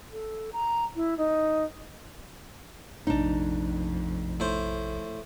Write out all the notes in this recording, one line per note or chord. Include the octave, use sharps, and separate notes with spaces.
A4
A#5
E4
D#4
A#1 F2 C3 A3 D4 D#4
A2 C5